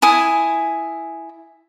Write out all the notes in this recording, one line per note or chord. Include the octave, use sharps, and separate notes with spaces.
E4 G#5 D#6